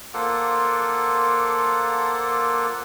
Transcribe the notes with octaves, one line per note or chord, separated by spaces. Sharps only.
A#3 F4 A4 C5 F#5 D6